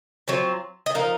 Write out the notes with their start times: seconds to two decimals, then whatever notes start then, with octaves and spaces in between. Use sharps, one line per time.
0.28 F#3 C4 F4
0.86 D#5
0.95 F3 A#3 D#4 F5